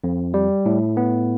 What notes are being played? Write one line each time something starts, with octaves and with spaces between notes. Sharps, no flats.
F2
G3
A2
B3